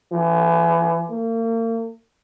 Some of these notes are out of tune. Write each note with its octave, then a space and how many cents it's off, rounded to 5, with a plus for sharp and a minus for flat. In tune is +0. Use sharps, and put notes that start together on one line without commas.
E3 +35
A#3 -40